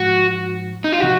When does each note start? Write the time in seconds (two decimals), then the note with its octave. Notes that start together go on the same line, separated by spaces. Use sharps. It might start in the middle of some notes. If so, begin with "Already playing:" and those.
Already playing: G#2 F3 G#3 F#4
0.84 D#4
0.92 F4
1.00 C3 F3 C4 F#4